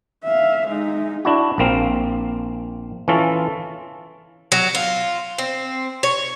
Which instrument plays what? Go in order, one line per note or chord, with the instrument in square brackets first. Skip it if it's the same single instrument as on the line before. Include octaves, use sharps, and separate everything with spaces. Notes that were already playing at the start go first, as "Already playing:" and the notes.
[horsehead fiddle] E5 F5
G#3 D#4
[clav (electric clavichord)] D4 E4 F#4
A#1 A#3 C4 F5
E3 C#4 F4 A4
[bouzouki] F#3
F4
C4
C#5